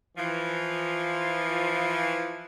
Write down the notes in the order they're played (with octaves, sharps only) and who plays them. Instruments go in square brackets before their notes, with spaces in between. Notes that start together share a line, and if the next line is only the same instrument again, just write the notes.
[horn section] E3 F3